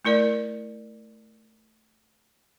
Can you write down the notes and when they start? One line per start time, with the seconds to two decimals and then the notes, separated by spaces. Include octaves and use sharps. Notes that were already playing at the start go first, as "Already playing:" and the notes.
0.05 A3 E4 A#4 D5